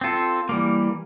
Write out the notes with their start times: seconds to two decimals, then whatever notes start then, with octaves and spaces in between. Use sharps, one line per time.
0.01 C4 F4 A4
0.49 E3 G3 A#3